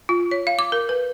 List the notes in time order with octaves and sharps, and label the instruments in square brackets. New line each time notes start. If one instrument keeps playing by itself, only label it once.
[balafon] F4
C#5
F5
D6
A#4
B4